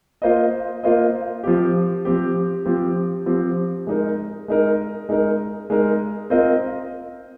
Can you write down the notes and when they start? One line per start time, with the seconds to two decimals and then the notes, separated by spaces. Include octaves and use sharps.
0.22 A#3 F4 C5 D#5
0.83 A#3 F4 C5 D#5
1.44 F3 C4 G4
2.05 F3 C4 G4
2.65 F3 C4 G4
3.26 F3 C4 G4
3.87 G#3 D#4 A#4
4.48 G#3 D#4 A#4
5.09 G#3 D#4 A#4
5.70 G#3 D#4 A#4
6.30 C4 F4 A#4 D#5